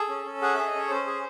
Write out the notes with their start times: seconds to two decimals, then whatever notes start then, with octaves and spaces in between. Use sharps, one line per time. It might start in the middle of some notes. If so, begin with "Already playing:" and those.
Already playing: G#4 A4
0.09 C#4
0.26 C#4
0.42 G#4 F#5
0.54 G#4 E5
0.67 D#5
0.74 C#4 C#5
0.90 C#4 C5
1.07 G#4